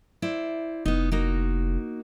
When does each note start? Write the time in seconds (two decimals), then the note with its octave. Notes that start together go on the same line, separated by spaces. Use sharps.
0.22 E4 C5 D5
0.85 F1 B3 D#4
1.12 A#3 D#4 F#4